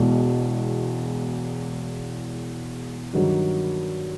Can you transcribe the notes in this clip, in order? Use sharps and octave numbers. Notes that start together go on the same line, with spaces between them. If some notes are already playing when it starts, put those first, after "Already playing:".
Already playing: E1 E2 B2 G#3
G2 D#3 F#3